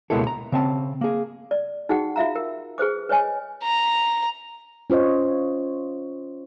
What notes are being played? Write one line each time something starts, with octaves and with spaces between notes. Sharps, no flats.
C#2 B2 G#3 A#3 E4 A4
A#5
C#3 C4 A5
A#3 G#4
D5
D#4 F#4 G#4 F#5 G5
F4 E5 F5 A#5
A#4
G#4 B4 C5 D6
B4 C#5 D#5 G#5
A#5
C#4 F4 C5 C#5 D#5